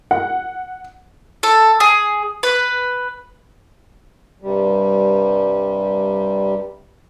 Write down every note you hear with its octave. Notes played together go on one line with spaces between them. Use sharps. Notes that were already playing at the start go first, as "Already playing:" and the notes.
F#5
A4
G#4
B4
G2 C3 G3